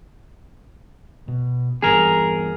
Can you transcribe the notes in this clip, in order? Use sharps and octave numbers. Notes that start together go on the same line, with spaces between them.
B2
G2 E3 B3 G#4 A#4